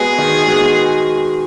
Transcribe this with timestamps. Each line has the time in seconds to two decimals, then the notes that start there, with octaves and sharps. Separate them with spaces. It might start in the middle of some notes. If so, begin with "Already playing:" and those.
Already playing: G#3 B3 F#4 G#4
0.18 D#3
0.46 G#3 B3 F#4